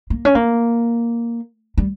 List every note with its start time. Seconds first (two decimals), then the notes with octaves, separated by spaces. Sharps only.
0.10 A#3
0.25 C#4
0.35 A#3
1.78 G3